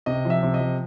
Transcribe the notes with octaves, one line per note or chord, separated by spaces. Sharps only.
C3 D#5
F3
E5
C3
D#5
F3